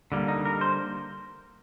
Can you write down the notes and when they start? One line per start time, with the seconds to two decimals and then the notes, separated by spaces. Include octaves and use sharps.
0.12 D3 G3 A#3
0.28 D#4
0.45 A#4
0.61 C5